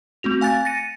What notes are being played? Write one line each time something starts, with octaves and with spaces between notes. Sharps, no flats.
A3 C4 F#4 F7
F5 G#5 F#6 A6
A6 A#6 C#7 D#7